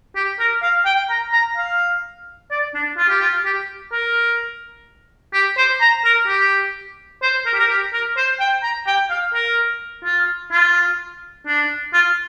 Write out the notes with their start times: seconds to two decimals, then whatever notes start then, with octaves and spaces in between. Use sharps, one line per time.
0.16 G4
0.39 A#4
0.62 F5
0.85 G5
1.10 A#5
1.32 A#5
1.57 F5
2.51 D5
2.75 D4
2.98 F4
3.09 G4
3.21 F4
3.45 G4
3.93 A#4
5.33 G4
5.57 C5
5.81 A#5
6.05 A#4
6.27 G4
7.22 C5
7.46 A#4
7.53 G4
7.60 A#4
7.70 G4
7.93 A#4
8.17 C5
8.40 G5
8.63 A#5
8.87 G5
9.10 F5
9.34 A#4
10.04 F4
10.52 F4
11.47 D4
11.94 F4